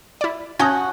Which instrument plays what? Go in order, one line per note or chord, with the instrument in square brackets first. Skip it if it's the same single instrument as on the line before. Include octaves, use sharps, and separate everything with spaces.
[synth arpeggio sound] E4 D5
[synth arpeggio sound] C#4 G6 A#6 [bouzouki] F#4 [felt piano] G#5 A5 D#6